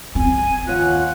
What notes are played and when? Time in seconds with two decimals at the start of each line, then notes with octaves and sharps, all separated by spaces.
0.15 C4 G#5
0.67 D#2 F4 C#5 F#5 F#6